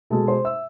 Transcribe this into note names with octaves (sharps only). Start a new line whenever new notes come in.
B2 G#3 A4 A5
C5 C6
E5 E6